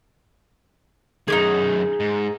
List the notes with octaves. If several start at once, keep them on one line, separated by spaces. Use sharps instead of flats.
F#2 D#3 D#4 G4 G#4
G#2